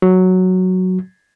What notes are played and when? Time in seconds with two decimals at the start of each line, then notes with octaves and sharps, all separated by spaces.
0.02 F#3